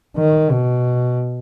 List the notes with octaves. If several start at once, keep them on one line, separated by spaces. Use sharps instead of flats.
D#3
B2